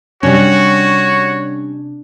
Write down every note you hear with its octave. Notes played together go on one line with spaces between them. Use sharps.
C3 G3 C#4 D4 F#4 C#5